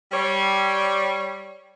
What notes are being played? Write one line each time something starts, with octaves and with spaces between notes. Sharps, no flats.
G3 C#5